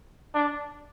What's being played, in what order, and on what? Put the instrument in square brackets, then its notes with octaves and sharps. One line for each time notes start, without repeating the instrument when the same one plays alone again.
[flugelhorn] D4